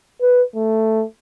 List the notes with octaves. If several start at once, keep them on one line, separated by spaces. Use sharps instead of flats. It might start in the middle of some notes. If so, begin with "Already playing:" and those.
B4
A3